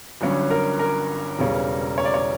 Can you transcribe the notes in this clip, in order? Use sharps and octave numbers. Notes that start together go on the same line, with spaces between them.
G1 G2 F#3 C#4
A#4
A#4
E1 E2 C#3 G3 C#4
C#5
D5
C#5